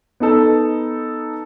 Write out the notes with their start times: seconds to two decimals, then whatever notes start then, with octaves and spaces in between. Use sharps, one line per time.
0.20 B3 D#4 A4